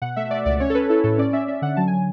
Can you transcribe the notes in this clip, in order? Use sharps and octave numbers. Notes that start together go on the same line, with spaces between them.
B2 F#5
A3 E5
A3 D5
C#2 D5
C#4 C#5
A4
C#4 B4
E4 A4
A2 A4
C#4 D5
C#4 E5
C#4 E5
D3 F#5
F#3 A5
G#5
F#3